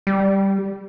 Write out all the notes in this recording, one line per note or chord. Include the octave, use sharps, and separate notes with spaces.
G3